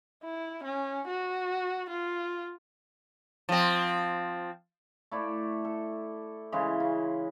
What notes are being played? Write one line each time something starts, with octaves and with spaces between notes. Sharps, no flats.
E4
C#4
F#4
F4
F3 C4
A3 E4 D5
A4
C#3 E3 G#3
C#3